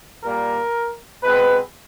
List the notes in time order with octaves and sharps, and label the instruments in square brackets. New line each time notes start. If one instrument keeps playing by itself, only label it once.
[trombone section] A#2 G3 A#3 A#4
B2 G#3 C4 B4